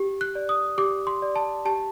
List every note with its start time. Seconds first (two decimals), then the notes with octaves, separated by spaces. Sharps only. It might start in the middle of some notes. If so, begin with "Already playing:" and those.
Already playing: G4
0.21 F#6
0.35 D5
0.49 D#6
0.78 G4 D6
1.07 C6
1.22 D5
1.36 A5
1.65 G4 A5